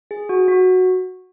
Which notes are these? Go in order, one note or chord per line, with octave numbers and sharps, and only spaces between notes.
G#4
F#4
F#4